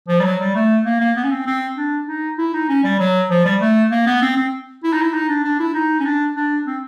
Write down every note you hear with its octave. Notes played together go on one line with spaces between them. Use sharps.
F3
G3
F#3
G3
A3
A#3
A#3
B3
C#4
C4
C4
D4
D#4
E4
D#4
C#4
G3
F#3
F3
G3
A3
A#3
B3
C4
C4
E4
D#4
E4
D#4
D4
D4
E4
D#4
C#4
D4
D4
C4